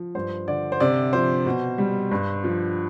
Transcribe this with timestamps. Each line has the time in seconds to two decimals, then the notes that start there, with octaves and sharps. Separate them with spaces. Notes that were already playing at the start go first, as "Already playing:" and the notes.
Already playing: F3
0.15 G2 C5
0.48 D3 D5
0.72 C5
0.80 C3 D5
1.13 F3 C5
1.46 B2
1.78 G3
2.11 G2
2.44 F3